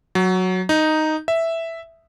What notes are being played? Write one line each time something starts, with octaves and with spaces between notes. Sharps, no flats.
F#3
D#4
E5